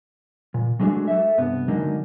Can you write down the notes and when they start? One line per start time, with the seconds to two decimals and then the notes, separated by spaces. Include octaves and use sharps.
0.54 A#2
0.79 F#3 G#3 A3 D4 F#4 G#4
1.08 A4 E5
1.37 C2 G2 B3
1.68 D3 F#3 G#3 A#3 D#4